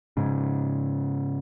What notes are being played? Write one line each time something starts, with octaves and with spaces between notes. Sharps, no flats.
G#2 C#3